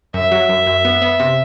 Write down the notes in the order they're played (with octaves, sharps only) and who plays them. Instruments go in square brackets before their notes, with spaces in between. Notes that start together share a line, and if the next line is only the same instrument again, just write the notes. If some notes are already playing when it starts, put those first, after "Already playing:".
[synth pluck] F#2 [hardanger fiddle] E5
[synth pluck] F#3
F#2
F#2
B3
B3
C3